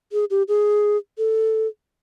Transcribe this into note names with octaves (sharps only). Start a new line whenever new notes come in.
G#4
G4
G#4
A4